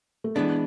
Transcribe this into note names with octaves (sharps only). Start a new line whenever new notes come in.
A3
E3 G#3 B3 D4